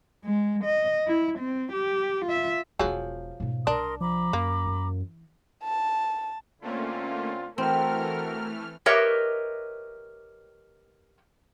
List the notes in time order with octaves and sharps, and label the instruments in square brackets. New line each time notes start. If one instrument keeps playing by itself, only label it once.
[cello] G#3
D#5
E4
C4
G4
F4 E5
[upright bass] E1 F4 [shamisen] F3 F#3 G#4
[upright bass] G#2 B2
[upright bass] C2 [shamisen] D4 [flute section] A#4 C6 D#6
[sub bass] F3 [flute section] A#5 B5 D6
[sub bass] F#2 [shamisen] A#3
[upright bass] E3
[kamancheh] A5
[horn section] D3 C4 F4 [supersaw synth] A3 A#3 C#4
[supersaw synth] E3 A3 F6 [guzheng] C4 [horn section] F#4 A4 A#4
[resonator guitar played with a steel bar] G4 A#4 B4 C#5 D#5 E5